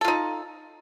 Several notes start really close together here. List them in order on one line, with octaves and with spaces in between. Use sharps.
A4 F4 D#4